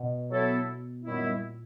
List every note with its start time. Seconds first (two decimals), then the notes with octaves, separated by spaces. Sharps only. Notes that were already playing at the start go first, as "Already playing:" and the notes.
Already playing: B2
0.30 F#3 B3 E4 A4
1.04 F#2 A#2 D#3 G3 B3 E4